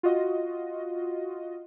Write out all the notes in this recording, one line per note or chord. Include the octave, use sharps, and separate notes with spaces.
F4 F#4 D#5